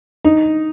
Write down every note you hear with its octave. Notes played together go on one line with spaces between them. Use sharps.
D#4